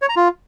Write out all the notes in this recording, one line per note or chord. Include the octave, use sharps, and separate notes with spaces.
C#5
A#5
F4